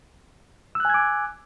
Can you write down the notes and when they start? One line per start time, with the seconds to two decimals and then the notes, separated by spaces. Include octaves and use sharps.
0.75 E6
0.80 F#6
0.85 G#5
0.90 G#6
0.94 D6